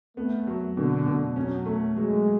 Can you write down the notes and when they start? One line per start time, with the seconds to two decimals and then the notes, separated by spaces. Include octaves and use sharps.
0.17 A3 B3
0.47 F#3
0.77 B2 D3
1.06 B2
1.36 F#3 C#4
1.66 A3
1.96 F#3 G#3